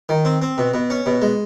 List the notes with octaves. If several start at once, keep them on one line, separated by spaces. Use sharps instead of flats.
D#3
C4
C4
B2
B2
C#4
B2
G#3